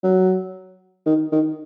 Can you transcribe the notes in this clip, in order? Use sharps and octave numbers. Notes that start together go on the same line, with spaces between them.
F#3
D#3
D#3